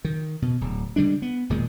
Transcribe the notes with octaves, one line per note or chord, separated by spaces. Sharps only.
D#3
B2
D1
D3 G3 G#3 D4
B3
E1 A#2 D#3 G#3